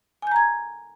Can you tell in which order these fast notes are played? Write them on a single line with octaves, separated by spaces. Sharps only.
G#5 G6 A#5 G#6